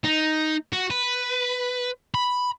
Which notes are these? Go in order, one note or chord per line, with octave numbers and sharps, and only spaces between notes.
D#4
F#4
B4
B5